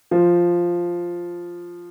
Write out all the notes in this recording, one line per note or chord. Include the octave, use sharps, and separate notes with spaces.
F3